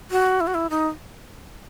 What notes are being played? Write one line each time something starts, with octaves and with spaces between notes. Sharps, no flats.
F#4
E4
F#4
E4
D#4